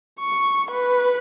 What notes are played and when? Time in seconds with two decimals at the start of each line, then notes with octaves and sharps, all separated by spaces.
0.20 C#6
0.71 B4